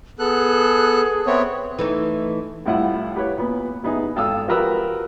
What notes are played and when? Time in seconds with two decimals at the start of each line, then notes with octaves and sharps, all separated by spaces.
0.19 B3 G#4 A4 F#6
1.26 B3 C4 C#5 E5
1.79 E3 A3 D#4
2.66 C2 A2 E4 F4 F#5
3.16 G4 B4 C#5
3.37 A#2 B3
3.83 A1 B3 D#4 G#4
4.16 G#1 A4 F5 G5 D#6 E6
4.48 F3 F#4 G4 A#4 B4 E6